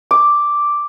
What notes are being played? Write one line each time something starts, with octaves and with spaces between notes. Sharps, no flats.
D6